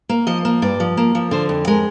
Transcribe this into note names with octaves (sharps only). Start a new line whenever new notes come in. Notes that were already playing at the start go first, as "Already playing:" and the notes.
A#3
F3 D#5
A#3
G2 D5
F3
A#3
F3
D3 C5
F2
G#3 A#4